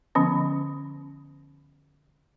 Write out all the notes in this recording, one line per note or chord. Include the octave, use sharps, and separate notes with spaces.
D3 F3 B3 C#4